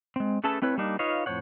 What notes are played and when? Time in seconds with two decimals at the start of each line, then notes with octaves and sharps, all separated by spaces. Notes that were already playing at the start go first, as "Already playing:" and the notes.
0.16 G#3 C4
0.44 A3 C#4 G#4 A4 B4 A5
0.62 A3 C4 E4 B4 C#5
0.78 G3 A#3 D4 D#4
0.99 D#4 F4 B4 C#5 D#5 F5
1.26 F2 A2 C5 C#5 F#5